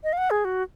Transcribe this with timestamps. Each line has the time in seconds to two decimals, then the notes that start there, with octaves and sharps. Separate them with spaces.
0.04 D#5
0.13 F5
0.18 F#5
0.31 G#4
0.45 F#4